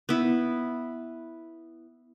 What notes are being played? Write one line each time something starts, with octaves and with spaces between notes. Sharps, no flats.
B3 E4